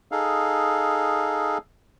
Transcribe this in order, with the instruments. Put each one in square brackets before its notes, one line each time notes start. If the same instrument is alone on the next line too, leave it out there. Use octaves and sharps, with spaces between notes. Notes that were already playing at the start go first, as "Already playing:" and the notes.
[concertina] D#4 G#4 A4 F5